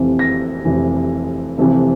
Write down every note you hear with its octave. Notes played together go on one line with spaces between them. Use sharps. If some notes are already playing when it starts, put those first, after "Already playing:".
Already playing: F1 F2 C3 E3
A#6
F1 F2 C3 E3
F1 F2 C3 E3